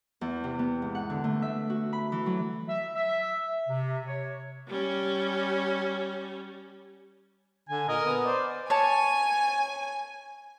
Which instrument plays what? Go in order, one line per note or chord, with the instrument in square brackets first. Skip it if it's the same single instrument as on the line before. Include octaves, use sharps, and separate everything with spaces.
[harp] E2
C3
B3
G#2
F#5
D3
A3
E5
F#4
B5
E3
F#3
[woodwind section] E5
E5
C3
C#5
[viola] G3 C#4
[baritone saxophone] D3 [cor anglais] G#5
[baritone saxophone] A#2 [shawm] A#4 [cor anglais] D#5
[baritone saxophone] B3 [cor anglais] D#5
[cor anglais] C5 [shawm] D5
[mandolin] C#5 A5 [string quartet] G#5